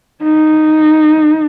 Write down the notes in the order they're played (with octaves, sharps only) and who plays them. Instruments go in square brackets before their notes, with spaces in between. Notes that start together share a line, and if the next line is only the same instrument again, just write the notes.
[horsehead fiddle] D#4